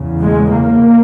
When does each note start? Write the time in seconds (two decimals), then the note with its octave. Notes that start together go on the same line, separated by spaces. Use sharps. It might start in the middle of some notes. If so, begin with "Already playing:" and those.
Already playing: E2 C#3
0.21 G#3
0.51 A#3